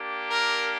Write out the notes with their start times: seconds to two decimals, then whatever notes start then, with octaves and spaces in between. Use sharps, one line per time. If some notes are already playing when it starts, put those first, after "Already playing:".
Already playing: A#3 D4 G4
0.29 A#4